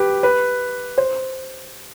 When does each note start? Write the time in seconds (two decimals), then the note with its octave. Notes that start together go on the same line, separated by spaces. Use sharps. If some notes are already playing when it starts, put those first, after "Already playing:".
Already playing: G4 B4
0.23 B4
0.98 C5